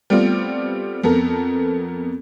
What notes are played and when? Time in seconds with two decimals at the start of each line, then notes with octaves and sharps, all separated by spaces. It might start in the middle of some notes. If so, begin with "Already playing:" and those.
0.10 G3 A3 B3 C4 F4
1.04 F2 B3 A4 A#4